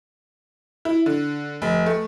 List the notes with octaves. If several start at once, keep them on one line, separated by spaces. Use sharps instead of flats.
E4
D3
F1
A3